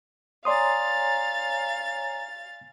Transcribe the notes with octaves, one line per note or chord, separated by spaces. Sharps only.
C#5 D5 F5 G#5 A#5 C6 D#6 A6